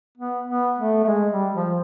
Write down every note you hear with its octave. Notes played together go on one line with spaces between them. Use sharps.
B3
B3
A3
A3
G#3
G3
F3